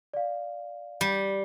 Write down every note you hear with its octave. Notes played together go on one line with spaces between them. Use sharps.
D5 F5
G3